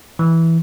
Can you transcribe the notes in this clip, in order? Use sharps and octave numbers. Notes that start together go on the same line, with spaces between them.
E3